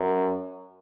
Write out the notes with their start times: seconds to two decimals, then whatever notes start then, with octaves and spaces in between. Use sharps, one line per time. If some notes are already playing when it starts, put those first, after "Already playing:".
Already playing: F#2